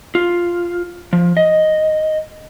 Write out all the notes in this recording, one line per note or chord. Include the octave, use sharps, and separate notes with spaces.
F4
F3
D#5